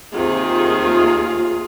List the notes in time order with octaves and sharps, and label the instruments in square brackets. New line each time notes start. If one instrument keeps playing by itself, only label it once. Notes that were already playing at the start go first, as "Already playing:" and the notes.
[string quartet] D#2 C3 D#3 [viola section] F4 G#4